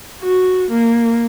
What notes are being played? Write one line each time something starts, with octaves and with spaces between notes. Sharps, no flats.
F#4
A#3